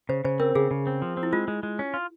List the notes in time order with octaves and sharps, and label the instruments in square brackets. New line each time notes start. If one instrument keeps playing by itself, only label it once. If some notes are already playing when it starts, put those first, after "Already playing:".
[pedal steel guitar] C#3 [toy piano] C5
[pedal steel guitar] C#3 [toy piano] C5
[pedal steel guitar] C4 [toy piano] A#4
[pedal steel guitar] C#3 [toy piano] G#4
[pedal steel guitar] C#3
C4
F3
C4
[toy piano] E4
[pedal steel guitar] G#3 [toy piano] F4
[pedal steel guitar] G#3
G#3
C#4
F4